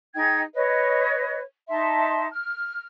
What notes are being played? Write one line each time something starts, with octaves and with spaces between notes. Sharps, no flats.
D#4 G#4 G5 G#6
B4 C#5 D#5
D#4 E5 A5 C6
F6